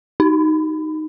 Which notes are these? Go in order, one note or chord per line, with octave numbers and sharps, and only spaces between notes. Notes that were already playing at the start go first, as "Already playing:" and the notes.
D#4